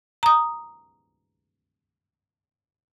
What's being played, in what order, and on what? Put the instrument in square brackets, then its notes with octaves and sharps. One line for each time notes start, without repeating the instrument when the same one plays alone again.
[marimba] A#5 D#6